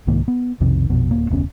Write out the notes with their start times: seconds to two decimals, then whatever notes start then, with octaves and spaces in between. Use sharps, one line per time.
0.07 C2 G#2 D#3 A#3
0.28 B3
0.60 B1 F2 C3 D#3
0.90 A#1 F2 B2
1.11 D1 A#3
1.30 F1 D2 B3 C#4